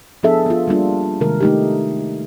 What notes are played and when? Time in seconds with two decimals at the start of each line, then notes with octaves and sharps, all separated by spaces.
0.23 F3 B3 D4 G#4 A4 E5
0.46 B3 F4
0.68 G3 A#3 D4 F4
1.21 C3 D#3 G#3 A#4
1.41 A3 D#4 G4